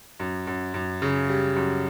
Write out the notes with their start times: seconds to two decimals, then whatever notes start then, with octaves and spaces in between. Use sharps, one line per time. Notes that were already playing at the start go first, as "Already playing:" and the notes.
0.20 F#2
0.47 F#2
0.74 F#2
1.02 C#3
1.29 G3
1.56 F#2